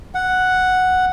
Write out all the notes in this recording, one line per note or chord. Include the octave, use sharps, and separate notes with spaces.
F#5